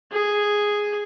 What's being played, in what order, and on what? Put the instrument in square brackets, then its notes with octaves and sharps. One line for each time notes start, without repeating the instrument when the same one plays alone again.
[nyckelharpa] G#4